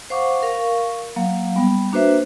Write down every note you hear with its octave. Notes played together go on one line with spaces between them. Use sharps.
C5 F5 F#5 C#6 D6
A#4 F5 C#6
F#3 A#3 F5
G3 B3
A#3 D4 F#4 B4 C5 E5